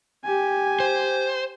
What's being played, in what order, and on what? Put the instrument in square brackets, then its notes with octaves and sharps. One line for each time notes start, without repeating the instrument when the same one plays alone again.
[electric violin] G4 G#5
[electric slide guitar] C5